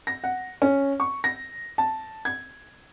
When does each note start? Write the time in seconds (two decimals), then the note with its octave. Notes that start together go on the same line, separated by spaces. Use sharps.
0.07 A#6
0.24 F#5
0.62 C#4
1.00 C#6
1.24 A#6
1.78 A5
2.25 G#6